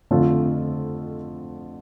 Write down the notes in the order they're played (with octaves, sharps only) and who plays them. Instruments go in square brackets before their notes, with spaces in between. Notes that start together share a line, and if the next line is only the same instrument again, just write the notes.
[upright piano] F2 D3 A3 C4 F4